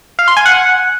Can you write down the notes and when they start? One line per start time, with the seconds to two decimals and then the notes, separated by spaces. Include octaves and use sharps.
0.19 F5
0.28 C6
0.37 G#5
0.46 F#5